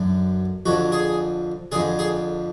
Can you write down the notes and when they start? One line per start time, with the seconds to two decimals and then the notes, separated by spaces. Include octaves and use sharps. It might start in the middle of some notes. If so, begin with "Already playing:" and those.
Already playing: F#2 D3
0.66 F2 D3 F#4
0.92 G#4
1.72 F2 D3 G#4
1.99 G#4